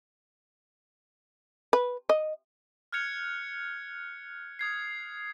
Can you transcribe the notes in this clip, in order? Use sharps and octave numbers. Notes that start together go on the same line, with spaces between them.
B4
D#5
F6 F#6 G#6 C#7 F7
D#6 G#6 C7